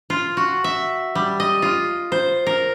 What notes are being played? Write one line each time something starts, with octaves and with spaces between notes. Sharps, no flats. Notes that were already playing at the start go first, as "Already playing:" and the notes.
F4
F#4
E5
G3
D#5
F4
C5
A#4